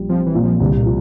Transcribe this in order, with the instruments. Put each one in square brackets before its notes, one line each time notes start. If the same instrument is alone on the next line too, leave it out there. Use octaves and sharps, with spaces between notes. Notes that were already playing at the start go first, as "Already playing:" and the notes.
Already playing: [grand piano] A#1 G3
[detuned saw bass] F3 [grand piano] C4
[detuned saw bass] E3
[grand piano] A#2
[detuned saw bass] F3
[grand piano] C2 [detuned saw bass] D3
[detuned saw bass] A#2
[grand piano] F3